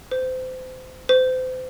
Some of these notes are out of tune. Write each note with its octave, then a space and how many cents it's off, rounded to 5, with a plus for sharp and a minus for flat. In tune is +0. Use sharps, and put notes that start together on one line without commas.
C5 -30
C5 -35